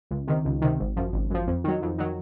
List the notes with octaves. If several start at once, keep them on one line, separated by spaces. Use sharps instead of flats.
C#2
C3 D#3
C#2
C3 D#3
G#1
F#2 F3
G#1
F#2 F3
F2
D#3 F#3
F2
D#3 F#3